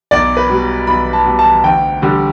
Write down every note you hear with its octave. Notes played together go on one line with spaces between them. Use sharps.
B1 D5
B4
B2 G3
B1 B5
A5
B2 G3
A5
D2 G5
D3 G3